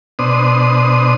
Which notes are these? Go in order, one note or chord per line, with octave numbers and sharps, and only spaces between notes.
B2 D4 C5 D#6